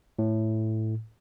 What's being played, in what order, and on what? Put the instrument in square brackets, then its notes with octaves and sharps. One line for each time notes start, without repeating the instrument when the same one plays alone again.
[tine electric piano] A2